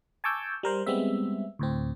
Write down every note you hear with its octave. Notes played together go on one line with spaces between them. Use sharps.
G#5 A5 C#6 D6 E6 G6
G3 A#4 C5
G3 G#3 B3 C4 E5
D2 A2 C4